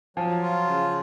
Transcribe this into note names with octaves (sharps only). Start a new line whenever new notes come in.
F3 F#3
F4
C#3